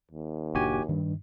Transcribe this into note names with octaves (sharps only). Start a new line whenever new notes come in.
D#2
F#1 A#2 D4 F#4 G4 G#5
G2 D#3